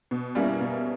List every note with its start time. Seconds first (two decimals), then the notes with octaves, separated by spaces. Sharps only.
0.11 B2
0.35 G3 A#3 C#4 E4
0.61 B2